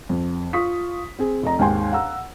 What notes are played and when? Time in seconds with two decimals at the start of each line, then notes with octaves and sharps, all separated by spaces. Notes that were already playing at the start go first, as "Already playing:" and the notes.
0.09 F2
0.53 F4 C#6 D#6 B6
1.19 C4 G#4
1.43 F1 D#5 A#5
1.59 D#2 G#2 D#3 G5 G#5 C6
1.92 F5 F#5 A#5 E6